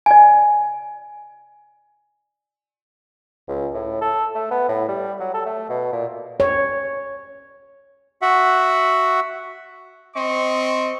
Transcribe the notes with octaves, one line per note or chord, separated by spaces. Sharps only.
D5 G#5
C#2
A2
A4
A3
B3
A2
G3
F#3
A4
A3
B2
A#2
C#5
F#4 E5 F#5
C4 D#5 C6 C#6